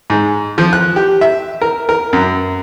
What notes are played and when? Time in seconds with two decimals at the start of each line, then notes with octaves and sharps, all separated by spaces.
0.10 G#2
0.58 F3
0.73 F#6
0.96 G4
1.21 E5
1.62 A#4
1.89 A#4
2.13 F#2